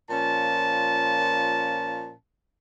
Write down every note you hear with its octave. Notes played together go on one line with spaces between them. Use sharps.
A#2 F3 C#4 A5